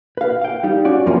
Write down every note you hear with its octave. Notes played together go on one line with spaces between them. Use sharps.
B4 F5
F5 G5
G3 D#4
C#4 F#4 D5
F2 E3 F3 A#3 C#4